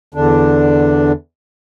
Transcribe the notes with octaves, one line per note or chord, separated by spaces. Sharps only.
E2 D3 D4